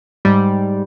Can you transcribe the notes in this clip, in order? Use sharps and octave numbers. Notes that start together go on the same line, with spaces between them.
G#2 G3